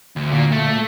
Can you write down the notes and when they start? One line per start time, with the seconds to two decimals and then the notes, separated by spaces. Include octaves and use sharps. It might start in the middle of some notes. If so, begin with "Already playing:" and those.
0.16 D2
0.32 A#2
0.52 A3